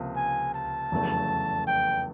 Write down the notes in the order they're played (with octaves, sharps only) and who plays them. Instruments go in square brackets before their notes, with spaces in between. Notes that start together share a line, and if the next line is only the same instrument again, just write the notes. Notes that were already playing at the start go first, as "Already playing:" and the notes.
Already playing: [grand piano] C#2 C3 F3 A#3
[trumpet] G#5
A5
[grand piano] F1 E2 C#3 F#3 A3
[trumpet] G5